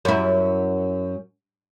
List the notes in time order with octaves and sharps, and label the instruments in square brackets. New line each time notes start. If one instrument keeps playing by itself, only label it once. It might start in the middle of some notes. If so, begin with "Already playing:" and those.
[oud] F#2 E4